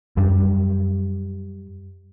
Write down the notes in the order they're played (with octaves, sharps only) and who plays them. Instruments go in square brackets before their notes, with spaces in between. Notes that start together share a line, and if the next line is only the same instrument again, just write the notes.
[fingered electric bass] F#2 G3